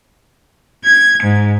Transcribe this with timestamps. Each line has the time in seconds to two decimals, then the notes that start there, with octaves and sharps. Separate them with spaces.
0.83 G#6
1.24 G#2